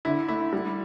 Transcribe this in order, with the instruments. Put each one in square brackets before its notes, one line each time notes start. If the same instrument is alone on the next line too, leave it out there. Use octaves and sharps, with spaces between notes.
[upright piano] D3 [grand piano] E4
[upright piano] A3 [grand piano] E4
[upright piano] G3